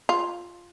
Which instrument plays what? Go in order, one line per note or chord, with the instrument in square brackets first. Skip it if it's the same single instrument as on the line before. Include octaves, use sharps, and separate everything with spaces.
[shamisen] F4